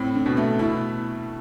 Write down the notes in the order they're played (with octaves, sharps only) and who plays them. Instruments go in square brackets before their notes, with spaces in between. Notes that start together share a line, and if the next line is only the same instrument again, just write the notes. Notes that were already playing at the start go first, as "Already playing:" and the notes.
Already playing: [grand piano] A2 [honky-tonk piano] C4
[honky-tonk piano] D3
[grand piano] B2
[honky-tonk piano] A3
[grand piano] B2 [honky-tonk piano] E4